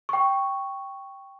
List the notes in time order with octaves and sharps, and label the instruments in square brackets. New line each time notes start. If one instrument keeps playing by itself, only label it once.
[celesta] G5 C#6